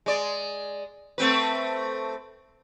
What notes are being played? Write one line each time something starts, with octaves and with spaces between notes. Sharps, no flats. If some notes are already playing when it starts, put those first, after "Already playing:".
G#3 D5
A3 C4 B4